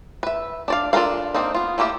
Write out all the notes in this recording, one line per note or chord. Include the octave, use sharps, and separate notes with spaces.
B4 E5
D4 D5 F5
D4 F4 A4 A#4 F5
A#3 C4 D4 D#4
B3 F4
A3 A#3 E4 G4 E5